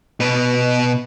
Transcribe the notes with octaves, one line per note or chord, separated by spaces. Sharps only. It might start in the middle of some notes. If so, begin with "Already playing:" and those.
B2 B4